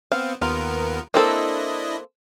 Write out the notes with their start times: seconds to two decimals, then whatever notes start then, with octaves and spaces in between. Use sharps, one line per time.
0.12 B3 C4 F5
0.42 D#2 B3 F4 A#4
1.14 A#3 C4 D4 E4 A4 D#5